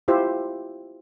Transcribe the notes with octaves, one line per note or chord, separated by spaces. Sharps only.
E4 F4 G4 C5 E5